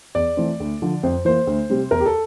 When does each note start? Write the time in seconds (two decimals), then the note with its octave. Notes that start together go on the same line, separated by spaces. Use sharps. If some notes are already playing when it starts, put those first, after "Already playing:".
0.15 E2 D5
0.37 E3 A3 C4
0.60 D2
0.82 D3 F3
1.03 F2 C5
1.25 E3 A#3 C5
1.47 D2
1.70 C3 G3 C4
1.91 E2 A#4
2.00 G4
2.06 A4